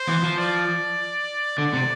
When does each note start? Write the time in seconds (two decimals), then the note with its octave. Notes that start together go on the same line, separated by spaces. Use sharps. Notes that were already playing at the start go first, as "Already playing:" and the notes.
Already playing: C5
0.08 E3
0.23 F3
0.38 D5
1.58 D3 D5
1.74 C3